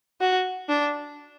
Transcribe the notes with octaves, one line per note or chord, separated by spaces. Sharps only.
F#4
D4